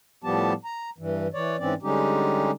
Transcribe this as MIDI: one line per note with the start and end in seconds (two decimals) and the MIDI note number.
0.24 0.53 45
0.24 0.53 53
0.24 0.53 55
0.24 0.53 59
0.24 0.53 67
0.24 0.53 81
0.65 0.90 82
0.98 1.28 43
0.98 1.28 52
1.34 1.56 52
1.34 1.56 73
1.34 1.56 74
1.59 1.74 44
1.59 1.74 52
1.59 1.74 60
1.59 1.74 61
1.59 1.74 74
1.83 2.51 50
1.83 2.51 55
1.83 2.51 56
1.83 2.51 61
1.83 2.51 63
1.83 2.51 67